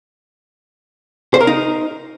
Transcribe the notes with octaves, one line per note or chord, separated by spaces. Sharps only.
C5
A#4
D#4